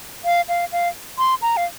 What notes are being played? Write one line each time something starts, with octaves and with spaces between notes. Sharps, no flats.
F5
F5
F5
C6
A#5
F5